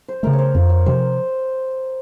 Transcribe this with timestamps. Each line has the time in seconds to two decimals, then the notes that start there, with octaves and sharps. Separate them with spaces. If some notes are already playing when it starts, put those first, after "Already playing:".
0.08 C5
0.23 C#3 A3 A#4
0.33 C#5
0.39 C5
0.55 F2 C5
0.70 C#5
0.86 C3 F3 C5